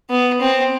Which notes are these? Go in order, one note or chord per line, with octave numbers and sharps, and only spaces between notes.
B3
C4